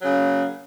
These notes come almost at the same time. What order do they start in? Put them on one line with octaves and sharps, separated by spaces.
F#3 C#3 A#3